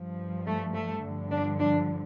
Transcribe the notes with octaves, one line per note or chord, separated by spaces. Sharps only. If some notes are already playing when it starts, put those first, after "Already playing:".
Already playing: G2 F3
A3
A3
G2 D3 F3
D4
D4